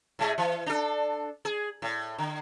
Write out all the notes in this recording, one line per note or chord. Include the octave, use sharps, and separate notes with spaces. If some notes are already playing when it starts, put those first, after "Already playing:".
A2 G#3 G#4
E3
D4 A4
G#4
A2
D3